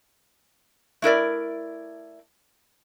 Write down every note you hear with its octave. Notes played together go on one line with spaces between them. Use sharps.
A3 E4 A#4 D5